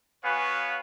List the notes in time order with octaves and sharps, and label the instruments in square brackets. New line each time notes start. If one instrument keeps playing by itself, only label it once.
[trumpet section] B3 F#4 B4 C#5 F5 G#5